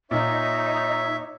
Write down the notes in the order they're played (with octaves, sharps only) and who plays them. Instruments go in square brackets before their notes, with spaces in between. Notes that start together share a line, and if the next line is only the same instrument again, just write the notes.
[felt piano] A#2 [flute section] D#4 [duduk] C#5 [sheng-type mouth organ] E5